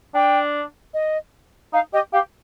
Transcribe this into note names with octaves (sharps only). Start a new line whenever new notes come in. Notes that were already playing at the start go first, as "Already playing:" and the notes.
D4 G5
D#5
D#4 F5
G4 D#5
G4 F5